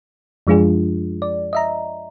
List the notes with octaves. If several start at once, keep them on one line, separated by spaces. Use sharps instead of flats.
F#2 F3 G#3 D4 F4 G#4
D5
D#5 E5 A#5